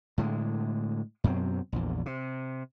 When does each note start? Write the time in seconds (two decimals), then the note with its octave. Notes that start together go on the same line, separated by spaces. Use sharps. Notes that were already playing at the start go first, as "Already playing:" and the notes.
0.18 A2 D3 G#3
1.24 F#2 B2 F#3 C4
1.72 A#1 E2
2.06 C3